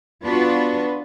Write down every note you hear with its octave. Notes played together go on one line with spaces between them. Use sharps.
B3 D4 F4 F#4 B4